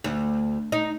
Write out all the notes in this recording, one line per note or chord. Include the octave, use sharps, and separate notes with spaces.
D2
D#4